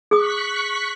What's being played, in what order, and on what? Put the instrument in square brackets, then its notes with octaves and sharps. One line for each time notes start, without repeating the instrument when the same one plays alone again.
[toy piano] G#4 D#6 [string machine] C#6 F#6 B6